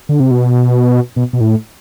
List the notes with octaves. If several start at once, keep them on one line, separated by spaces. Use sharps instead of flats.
D3
C3
B2
B2
B2
A2